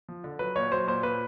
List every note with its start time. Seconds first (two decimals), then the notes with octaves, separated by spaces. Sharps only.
0.09 F3
0.24 D3
0.39 F#3 B4
0.56 A#2 C#5
0.72 F#3 C5
0.87 A#2 C5
1.03 A#2 B4